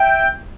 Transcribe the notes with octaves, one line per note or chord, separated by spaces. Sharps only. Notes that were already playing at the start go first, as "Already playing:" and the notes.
Already playing: E5 G5